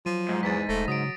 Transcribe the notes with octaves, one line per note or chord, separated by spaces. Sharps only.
F3 F#3 D#7
G#2
E2 A6 B6
E1 A3 A#6
C#3 F#3 D#6 D7